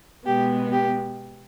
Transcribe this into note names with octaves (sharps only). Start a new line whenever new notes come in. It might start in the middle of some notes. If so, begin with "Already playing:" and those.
B2 G#3 B3 G4
G4